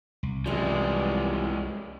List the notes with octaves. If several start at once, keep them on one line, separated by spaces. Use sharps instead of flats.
C2
F#2 E3 F3 G3 G#3